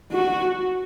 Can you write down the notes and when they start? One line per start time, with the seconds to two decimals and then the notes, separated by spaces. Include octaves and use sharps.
0.12 F#4